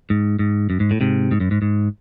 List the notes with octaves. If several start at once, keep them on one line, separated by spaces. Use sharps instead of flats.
G#2
G#2
F#2
G#2
A2
G#2 C3
G#2
F#2
G#2
G#2